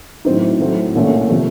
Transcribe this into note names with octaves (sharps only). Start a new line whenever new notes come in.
A2 F#3 C4 D#4
A2 F#3 A3 C4
C2 A#2 A3 C#4
C3 F3 A3